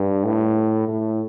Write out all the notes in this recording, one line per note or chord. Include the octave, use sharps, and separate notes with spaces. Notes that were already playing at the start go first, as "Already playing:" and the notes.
Already playing: G2
A2
A2